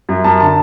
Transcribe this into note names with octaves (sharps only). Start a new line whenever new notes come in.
F#2
F#2 A5
D3 A5